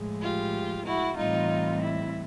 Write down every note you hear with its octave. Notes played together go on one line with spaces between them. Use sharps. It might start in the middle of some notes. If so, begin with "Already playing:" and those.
Already playing: A2 F3 G#3
F4 G4
E4 F#4
A2 E3 G3 C4 D#4 F4
E4